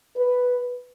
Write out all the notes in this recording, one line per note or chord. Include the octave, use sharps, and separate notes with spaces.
B4